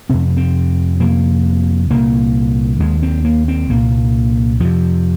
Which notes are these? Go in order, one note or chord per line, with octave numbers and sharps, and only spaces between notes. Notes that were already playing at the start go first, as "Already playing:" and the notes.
F2 C3 C4
C4
F2 C3 A#3
C2 A#2 A#3
D#2 G#3
C4
A#3
C4
C2 A#2 A#3
F2 C3 F3